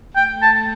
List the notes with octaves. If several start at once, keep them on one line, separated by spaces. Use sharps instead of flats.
A3 G5
A5